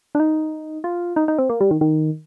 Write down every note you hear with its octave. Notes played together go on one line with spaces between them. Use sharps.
D4
D#4
F4
D#4
D#4
C4
A#3
G3
D#3
D#3